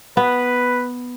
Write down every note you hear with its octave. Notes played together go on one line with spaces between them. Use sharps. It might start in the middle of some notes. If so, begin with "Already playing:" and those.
B3 B4